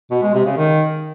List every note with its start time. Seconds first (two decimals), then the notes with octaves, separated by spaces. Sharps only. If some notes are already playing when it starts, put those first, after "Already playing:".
0.10 B2
0.22 G#3
0.34 C3
0.45 C#3
0.57 D#3